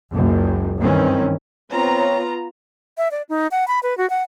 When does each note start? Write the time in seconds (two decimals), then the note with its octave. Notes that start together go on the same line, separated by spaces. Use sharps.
0.13 F#1 C#2 F#2
0.79 G2 D#3 E3 C4 C#4
1.71 B3 C4 F4 C#5 A#5
2.97 E5
3.11 D5
3.29 D#4
3.51 F#5
3.68 B5
3.83 B4
3.98 F#4
4.10 F#5